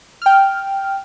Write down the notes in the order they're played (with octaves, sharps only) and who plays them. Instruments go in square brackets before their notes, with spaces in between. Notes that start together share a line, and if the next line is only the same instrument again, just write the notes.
[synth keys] G5 F6